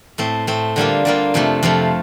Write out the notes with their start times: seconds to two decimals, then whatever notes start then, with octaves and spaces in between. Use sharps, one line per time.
0.18 A2 A3 C4
0.47 A2 A3 C4
0.76 D3 G3 A#3 F4
1.05 D3 G3 A#3 F4
1.34 F2 C3 F3 A3
1.63 F2 C3 F3 A3